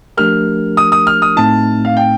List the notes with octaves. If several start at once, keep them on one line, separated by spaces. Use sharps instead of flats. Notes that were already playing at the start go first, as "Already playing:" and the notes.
F3 A3 D4 G4 A#4 F6
D#6
D#6
F6
D#6
A2 A3 C4 D#4 A5
F5
G5